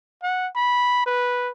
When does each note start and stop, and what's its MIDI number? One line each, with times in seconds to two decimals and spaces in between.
0.23 0.48 78
0.56 1.05 83
1.06 1.51 71